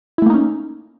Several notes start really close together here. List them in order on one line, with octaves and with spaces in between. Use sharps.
E4 A3 A#3 D#4 C#4